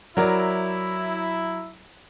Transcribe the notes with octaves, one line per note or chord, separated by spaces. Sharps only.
F#3 E4 A#4 D5